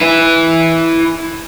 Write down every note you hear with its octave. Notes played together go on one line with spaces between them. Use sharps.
E4 B4